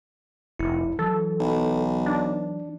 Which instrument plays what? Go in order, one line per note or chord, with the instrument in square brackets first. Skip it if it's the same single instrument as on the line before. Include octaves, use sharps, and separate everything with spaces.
[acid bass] F1 [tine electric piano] E4
[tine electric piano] E3 F#3 [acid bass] A4
[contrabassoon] B1
[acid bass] D4